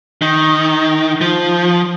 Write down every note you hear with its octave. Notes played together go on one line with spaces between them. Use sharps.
D#3
F3